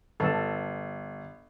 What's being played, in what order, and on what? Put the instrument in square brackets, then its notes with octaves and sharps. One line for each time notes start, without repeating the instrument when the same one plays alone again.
[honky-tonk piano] G1 [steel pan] A4